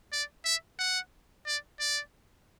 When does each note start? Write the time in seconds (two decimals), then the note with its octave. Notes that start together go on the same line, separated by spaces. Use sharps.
0.13 D5
0.45 E5
0.79 F#5
1.46 D5
1.80 D5